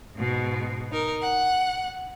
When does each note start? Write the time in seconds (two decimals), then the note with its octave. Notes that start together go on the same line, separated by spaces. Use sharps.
0.15 G#2 B2
0.91 D#4 A#4
1.23 F#5